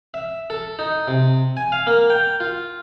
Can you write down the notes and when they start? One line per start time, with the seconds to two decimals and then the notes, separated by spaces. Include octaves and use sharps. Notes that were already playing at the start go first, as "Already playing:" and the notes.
0.14 E5
0.50 A4
0.79 D#4
1.08 C3
1.57 G#5
1.72 F5
1.87 A#3
2.10 G5
2.40 F4